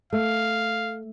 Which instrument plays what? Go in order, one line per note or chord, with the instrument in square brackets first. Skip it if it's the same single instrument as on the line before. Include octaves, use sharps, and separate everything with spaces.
[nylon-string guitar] A3 [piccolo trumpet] F5